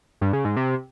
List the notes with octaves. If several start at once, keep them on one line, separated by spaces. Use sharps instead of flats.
G2
C#3
G#2
C3